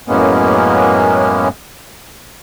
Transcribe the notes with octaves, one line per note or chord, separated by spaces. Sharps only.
F#2 A2 G#3 A#3 B3 C#4